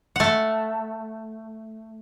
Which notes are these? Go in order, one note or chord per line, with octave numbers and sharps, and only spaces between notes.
A3 F#5